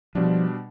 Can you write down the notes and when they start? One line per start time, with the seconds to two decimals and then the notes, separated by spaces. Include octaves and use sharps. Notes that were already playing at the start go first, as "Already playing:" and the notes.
0.15 B2 F3 G3 D4